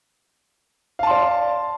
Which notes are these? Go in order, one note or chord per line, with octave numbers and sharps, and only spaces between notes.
D5 F5 A5 C6